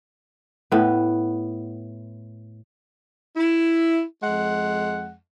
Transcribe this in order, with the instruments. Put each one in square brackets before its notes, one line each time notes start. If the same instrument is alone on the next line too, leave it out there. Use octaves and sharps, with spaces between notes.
[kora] A2 B3
[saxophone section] E4
F2 G#3 F#5